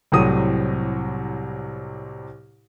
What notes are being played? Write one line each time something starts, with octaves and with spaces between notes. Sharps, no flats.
C2 A2 C3 F#3 D#6 D#7